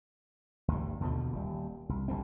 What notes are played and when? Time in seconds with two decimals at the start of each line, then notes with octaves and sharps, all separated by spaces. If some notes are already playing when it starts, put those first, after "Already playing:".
0.68 D2 G2
1.00 D#2 B2 D3 F3
1.32 D#1 G3
1.89 C2
2.08 G#1 D3 G3 C4